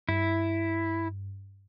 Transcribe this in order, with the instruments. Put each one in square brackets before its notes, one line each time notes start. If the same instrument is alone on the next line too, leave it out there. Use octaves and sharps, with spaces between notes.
[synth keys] G2 [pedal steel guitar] E4